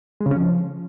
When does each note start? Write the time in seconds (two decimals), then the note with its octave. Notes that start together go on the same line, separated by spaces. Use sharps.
0.21 G#3
0.26 C#3
0.31 C#4
0.37 F3